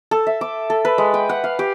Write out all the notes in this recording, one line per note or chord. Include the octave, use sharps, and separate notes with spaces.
A4
E5
D6
A4
B4
G#3
G5
F#5
F5
G4